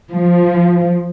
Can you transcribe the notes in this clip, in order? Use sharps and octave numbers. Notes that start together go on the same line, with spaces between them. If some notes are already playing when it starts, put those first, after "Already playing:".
F3